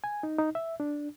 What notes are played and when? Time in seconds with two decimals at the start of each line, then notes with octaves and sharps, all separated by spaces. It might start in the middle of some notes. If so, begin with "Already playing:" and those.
0.04 G#5
0.23 D#4
0.38 D#4
0.55 E5
0.80 D4